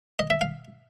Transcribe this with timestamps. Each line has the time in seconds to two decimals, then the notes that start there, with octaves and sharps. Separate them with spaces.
0.19 D#5
0.30 E5
0.41 F5